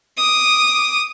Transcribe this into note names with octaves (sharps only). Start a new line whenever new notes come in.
D6 D#6